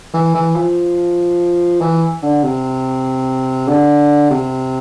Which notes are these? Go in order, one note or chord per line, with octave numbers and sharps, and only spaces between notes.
E3
E3
F3
E3
D3
C3
D3
C3